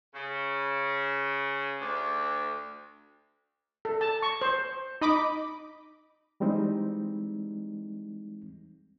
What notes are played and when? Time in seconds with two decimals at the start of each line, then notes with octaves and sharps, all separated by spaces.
0.15 C#3
1.82 D2
3.85 A4
4.01 A5
4.22 C#6
4.41 C5
5.01 D#4 D#5 B5 D6
6.40 E3 G3 G#3 C4 D#4